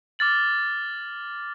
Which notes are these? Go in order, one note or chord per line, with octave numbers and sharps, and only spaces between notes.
D6 F6 A6 F#7